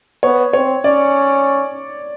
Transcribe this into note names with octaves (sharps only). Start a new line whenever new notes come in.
B3 C#5
C4 C#5
C#4 D5